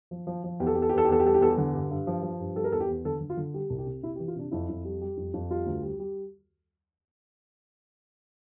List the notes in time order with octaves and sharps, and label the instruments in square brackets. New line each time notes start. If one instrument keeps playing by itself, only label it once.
[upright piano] F3
F3
F3
E2 G4
A4
E2 G4
A4
G4
E2 A4
G4
E2 A4
G4
G3 A4
G4
E2 A4
G4
D3
G2
G2
F3
F3
G2
G3 A4
A#4
E2 A4
G4
E2
D3 A4
D3
F4
D3
G3 G4
C2
G4
C3
C3 E4
G4
E3
F4
C3 D4
F2 E4
F2
G3
G3
F2
F2
G3 F4
D2
G3
G3